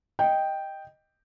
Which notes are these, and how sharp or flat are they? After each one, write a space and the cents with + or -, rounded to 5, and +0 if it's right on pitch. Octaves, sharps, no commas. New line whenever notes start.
D#5 +0 G5 +0